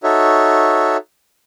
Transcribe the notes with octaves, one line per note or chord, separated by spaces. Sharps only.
D#4 F#4 A4 C#5 E5